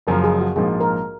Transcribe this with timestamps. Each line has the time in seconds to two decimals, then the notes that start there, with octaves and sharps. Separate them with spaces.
0.07 F#1 F#2 C#3 F3 A#4
0.24 G#4
0.41 F#4
0.56 A#1 G#2 F3 A#3 F4 G#4
0.81 A#4